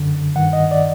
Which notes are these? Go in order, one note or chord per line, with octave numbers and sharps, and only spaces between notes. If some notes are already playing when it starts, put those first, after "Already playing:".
Already playing: F#2 D3
G2 D#3 F#5
D#5
D5